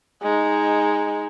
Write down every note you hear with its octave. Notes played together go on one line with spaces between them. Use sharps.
G#3 D#4